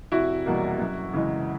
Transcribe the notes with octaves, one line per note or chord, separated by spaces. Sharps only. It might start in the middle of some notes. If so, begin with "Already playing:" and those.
F1 E4 F#4
E2 B2 G3 A#3
F#2
C#3 E3 G#3